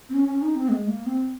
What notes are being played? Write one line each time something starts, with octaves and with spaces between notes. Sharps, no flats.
C4
C#4
C#4
D#4
C4
G#3
A#3
C4